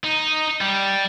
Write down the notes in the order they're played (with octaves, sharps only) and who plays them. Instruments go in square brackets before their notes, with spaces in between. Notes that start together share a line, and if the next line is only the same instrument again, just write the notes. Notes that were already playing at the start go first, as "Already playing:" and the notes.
[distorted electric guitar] D#4
G3